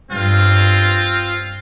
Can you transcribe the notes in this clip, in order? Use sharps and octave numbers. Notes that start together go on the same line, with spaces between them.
G2 C4 F4